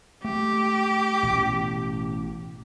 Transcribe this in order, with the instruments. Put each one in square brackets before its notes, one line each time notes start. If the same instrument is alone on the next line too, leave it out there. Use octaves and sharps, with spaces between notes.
[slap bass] A3 [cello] G4
[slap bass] A1 B2